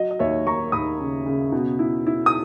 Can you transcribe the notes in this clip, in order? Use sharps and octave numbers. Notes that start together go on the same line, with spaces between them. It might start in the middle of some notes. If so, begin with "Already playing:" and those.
Already playing: F#3 D#5
D#5
D#2 C#5 E5
D#2 A#5 C#6
D#2 B5 D#6
C#3
C#3
B2
E4
E4
D#6